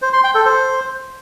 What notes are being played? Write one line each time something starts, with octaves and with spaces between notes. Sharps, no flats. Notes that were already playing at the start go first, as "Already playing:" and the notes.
C5
C6
G5
A4
C5